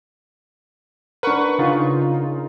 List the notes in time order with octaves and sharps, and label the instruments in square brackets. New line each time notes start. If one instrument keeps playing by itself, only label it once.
[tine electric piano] D4 A#4 [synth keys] B4 F#5 C#6
[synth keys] C#3 D#4 F4